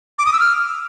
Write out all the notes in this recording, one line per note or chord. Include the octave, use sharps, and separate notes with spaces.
D6
D#6
E6
F6